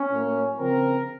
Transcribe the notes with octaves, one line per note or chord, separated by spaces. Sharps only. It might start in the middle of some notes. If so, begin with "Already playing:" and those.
Already playing: C#4
A2 F#3 A#3
C#3 F3 C4 A#4